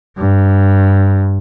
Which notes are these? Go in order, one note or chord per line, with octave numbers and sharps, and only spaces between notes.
G2